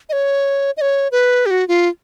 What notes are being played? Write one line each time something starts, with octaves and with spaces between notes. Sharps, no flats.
D#5
C#5
D#5
C#5
B4
G4
F#4
F4